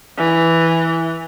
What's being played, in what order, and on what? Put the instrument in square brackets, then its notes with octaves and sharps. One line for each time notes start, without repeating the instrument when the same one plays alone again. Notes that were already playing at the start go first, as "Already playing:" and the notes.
[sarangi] E3